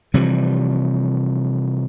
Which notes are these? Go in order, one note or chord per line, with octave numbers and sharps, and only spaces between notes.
C3 E3 F3 G3